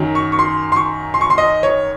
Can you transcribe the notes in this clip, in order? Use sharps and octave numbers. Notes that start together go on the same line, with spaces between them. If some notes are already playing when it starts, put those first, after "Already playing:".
Already playing: F#2 D#3 F#3
C#6
C#6
C6
C6
C#6
C6
C#6
C6
D#5
C#5